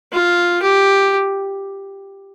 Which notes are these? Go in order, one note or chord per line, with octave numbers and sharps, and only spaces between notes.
F4
G4